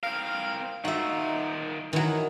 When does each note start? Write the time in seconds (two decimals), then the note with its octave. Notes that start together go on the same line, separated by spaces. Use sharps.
0.03 C4 A#4 F5
0.85 D#3 D#4 F4 F#4 E5
1.93 D#3 E3 F#3